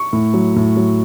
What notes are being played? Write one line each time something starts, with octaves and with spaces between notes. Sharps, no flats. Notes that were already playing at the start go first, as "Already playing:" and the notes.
Already playing: C#6
A2
F#3
A2
F#3